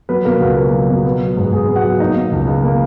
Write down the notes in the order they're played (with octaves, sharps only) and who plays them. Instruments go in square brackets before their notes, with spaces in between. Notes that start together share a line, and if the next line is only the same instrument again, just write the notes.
[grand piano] F#3 B3 B4
B2 A#3 A#4
C#2 F#4
A#3
F#3
B2
B3
F#3
G#2
G#2 G#4
B3
F#4 F#5
F#3
A#3 D#4 D#5
B2
C#2
C#2
A#3